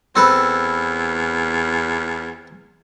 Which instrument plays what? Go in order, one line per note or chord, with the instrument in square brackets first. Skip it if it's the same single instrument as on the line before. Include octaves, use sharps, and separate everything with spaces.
[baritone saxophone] E2 [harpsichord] C4 A4 B4